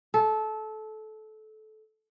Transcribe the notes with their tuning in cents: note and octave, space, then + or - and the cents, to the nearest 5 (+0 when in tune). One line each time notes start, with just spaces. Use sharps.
A4 -20